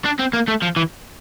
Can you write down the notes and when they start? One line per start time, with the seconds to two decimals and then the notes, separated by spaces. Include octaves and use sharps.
0.05 D4
0.19 C4
0.33 A#3
0.48 A3
0.62 F3
0.76 E3